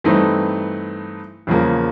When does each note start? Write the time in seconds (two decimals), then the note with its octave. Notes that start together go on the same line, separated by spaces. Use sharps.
0.04 G2 E3 A3 C4 D#4
1.47 E2 C#3 F3 A#3